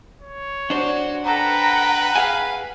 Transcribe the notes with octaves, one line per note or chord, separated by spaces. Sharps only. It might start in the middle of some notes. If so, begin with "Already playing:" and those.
C#5
D4 F#4 C5 D5
A4 B4 F#5 G5 A#5
G#4 F5 F#5 G#5